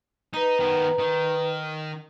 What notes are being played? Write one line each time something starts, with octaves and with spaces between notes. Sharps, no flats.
D#4 B4 A#5
D#3 B3
D#3